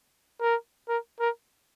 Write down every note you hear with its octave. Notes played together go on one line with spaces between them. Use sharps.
A#4
A#4
A#4